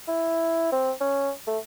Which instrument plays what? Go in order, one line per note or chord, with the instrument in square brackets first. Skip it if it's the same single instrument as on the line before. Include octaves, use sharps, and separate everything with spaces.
[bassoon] E4
C4
C#4
A3